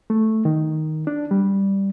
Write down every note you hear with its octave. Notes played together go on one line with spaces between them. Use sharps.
A3
D#3
D4
G3